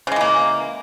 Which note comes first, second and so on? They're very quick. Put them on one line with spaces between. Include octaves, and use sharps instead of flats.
C#3 G#3 E3 A#3